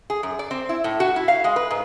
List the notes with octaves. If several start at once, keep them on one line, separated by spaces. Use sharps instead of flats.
G#4
F#2
D5
C4
E4
A2
F#4
E4
F5
G#3
B4
G#2